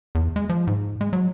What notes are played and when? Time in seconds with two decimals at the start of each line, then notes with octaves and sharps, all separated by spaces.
0.15 E2
0.36 G#3
0.49 F3
0.67 G#2
1.01 G#3
1.13 F#3